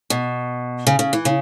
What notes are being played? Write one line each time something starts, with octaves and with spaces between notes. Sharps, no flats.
B2
C#3
C#3
E3
C#3